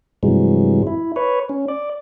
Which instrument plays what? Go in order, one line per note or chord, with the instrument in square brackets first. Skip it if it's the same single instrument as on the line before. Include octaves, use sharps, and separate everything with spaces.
[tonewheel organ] G2 C3 E3 F#3 G#3
E4
B4 C#5
C#4
D5